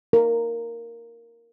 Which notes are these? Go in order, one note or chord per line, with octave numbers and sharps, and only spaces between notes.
A#4